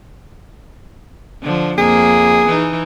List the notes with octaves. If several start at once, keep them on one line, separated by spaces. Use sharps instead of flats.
D3 F3
F2 A#3 G#4
E3 D#4